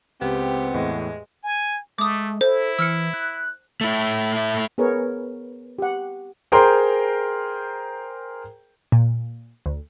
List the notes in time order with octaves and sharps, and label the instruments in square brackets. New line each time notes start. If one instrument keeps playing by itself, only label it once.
[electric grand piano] C#2 [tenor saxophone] B3 [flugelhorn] C4 [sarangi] G4
[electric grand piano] E2 A2 [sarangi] G#3
[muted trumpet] G#5
[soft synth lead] G#3 [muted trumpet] A3 [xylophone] D6 D#6
[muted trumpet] E4 [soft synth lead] A4 [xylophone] C5
[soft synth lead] E3 [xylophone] E6 F6 C#7
[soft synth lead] F#6
[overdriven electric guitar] A3 E4
[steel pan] B3 G#4 A#4 B4 C#5
G4 F#5
[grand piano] G#4 A#4 C5 G5 A#5 C6
[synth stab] A#2
D2